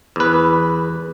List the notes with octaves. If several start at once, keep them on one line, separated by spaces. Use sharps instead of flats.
E2 B4